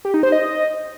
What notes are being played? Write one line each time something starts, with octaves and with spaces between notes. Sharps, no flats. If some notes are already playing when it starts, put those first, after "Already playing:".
G4
D#4
C5
D#5